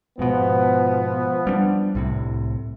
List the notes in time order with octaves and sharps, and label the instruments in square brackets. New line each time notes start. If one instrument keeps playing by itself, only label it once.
[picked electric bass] G#2 B2 [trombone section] F3 B3
[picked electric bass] G3 C#4 D4
C2 A2 C3